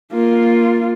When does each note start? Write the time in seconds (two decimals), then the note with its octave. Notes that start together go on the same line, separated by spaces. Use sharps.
0.12 A#3 F4